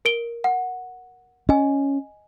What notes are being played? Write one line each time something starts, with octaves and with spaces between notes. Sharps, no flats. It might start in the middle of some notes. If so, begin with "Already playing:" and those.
A#4 D7 G7
F#5
C#4 D#5 G#5